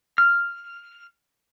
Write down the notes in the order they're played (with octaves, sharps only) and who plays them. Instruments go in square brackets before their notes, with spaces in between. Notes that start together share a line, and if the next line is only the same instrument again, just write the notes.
[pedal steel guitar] F6